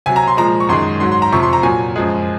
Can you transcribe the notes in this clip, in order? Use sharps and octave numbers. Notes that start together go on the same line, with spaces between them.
C3 F#3 G#5
A#5
C6
A#2 F3 G#3 A#5
C#6
F#2 D#3 G#3 C6
G#2 F#3 C6
C6
A#5
F2 C3 F3 C#6
C6
A#5
A#2 F#3 G#5
F#2 F3 G#3